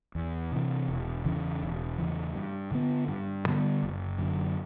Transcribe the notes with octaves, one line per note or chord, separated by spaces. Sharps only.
E2
C3 E3
E1
E2 C#3 E3
E1
E2 C#3 E3
G2
D3 G3 B3
G2
D3 G3 B3
F#1
F#2 D3